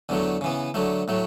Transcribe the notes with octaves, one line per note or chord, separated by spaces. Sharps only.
E2 D3 F#3 A3
C#3 E3 B3
D3 F#3 A3
A2 F#3 A3